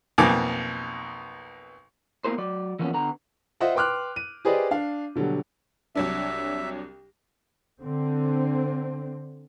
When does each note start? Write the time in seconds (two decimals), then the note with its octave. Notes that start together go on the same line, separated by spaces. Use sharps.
0.18 B1 F2 A#3 G#5 D6
2.25 A#3 B3 E4 A#4 C5
2.38 F#3 D5
2.79 E3 F3 A#3 B3 C#4
2.93 D3 B3 A#5
3.61 F4 C5 D#5 E5 F#5
3.75 B4 G5 C6 D6 F6 F#6
4.16 D#7
4.45 G4 G#4 B4 C5 D5 D#5
4.71 D4 F5
5.15 B2 D3 F#3 G3
5.95 C2 F#3 D4 E5
7.82 D3 C4